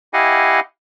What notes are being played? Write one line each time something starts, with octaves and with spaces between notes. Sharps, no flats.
E4 G4 D#5 F5 F#5 G#5